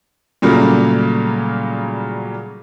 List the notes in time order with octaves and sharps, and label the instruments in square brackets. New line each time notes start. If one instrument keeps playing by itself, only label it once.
[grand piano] A#2 C#3 F#3 G3 A3 A#3